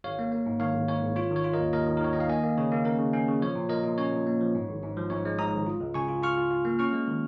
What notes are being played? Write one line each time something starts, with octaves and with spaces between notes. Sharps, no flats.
G#1 C#5 F5
A#3
A#3
G#2
D#3 C#5 F5
G#1
G#2 C#5
G#1
F4 C#5
D#3 C#5
F4
A#4 D#5
D#2
D#2 A#4 D#5
D#3
A#4
D#3 C#5
D#3 D#5
F5
A#3 D#5 G#5
A#3
C#3 C#5
A#3
C#4 A#4
C#3
C#4
C#3
F3 C#5
A#2
A#2 A#4 D#5
A#2
C#4 C#5
A#2
A#3
F3
G#2
G#1
G#2
F3
G#2 C#5
G#3
G#2 A#5 D#6
G#1
F4
C#2
C#3 G#5 C#6
F4
F4 C#6 F6
F4
F4
A#3
C#4 C#6 F6
G#3
D#3